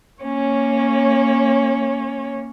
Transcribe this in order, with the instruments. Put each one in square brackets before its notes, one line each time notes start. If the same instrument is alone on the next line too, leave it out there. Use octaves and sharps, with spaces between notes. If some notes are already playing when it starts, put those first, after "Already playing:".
[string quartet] A#3 C#4 C#5